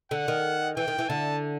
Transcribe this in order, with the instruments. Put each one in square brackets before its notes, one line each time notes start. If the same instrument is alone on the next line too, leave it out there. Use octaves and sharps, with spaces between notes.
[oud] D3 [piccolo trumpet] F#5
[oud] D#3
[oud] E3 [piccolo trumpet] G5
[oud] D#3
E3
[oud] D3 [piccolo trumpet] A5